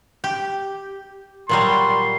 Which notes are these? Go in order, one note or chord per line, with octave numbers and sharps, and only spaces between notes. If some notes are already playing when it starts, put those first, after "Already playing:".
G4
A#2 F#3 G3 C6